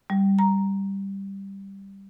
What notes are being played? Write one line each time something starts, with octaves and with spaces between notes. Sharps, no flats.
G3
A#5